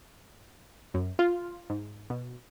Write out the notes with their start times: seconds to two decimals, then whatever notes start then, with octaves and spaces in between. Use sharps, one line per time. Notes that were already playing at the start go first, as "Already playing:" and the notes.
0.94 F#2
1.19 F4
1.70 G#2
2.10 B2